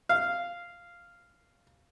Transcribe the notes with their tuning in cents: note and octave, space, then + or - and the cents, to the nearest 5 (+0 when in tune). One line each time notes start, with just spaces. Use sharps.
F5 -5